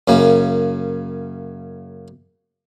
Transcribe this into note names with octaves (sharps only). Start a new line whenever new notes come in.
F#2 C#3 A#3